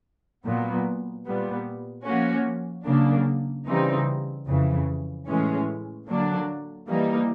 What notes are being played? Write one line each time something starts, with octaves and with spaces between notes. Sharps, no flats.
A#2 F#3 B3
A#2 G3 B3
F3 A#3 C#4 F#4
C#3 F#3 A#3 D4
C#3 E3 G3 C4 D#4
F2 C#3 E3
A2 E3 G#3 C#4
D3 F#3 A#3 D4
E3 G3 A#3 D#4